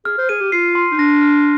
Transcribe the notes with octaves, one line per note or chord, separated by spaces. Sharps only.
G#4 F6
C5
G#4 D#7
G4
F4 C7
C6
D#4
D4 A#6
F6